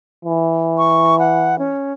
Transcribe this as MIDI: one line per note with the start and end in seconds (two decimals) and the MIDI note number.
0.25 1.74 52
0.78 1.18 85
1.19 1.58 78
1.59 1.93 61